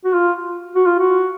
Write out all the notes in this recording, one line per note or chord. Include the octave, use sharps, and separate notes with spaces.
F#4
F4
F#4
F4
F#4